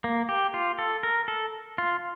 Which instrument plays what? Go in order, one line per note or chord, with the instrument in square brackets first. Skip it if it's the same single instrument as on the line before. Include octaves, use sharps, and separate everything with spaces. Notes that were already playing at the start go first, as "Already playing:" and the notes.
[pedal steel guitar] A#3
G4
F4
A4
A#4
A4
F4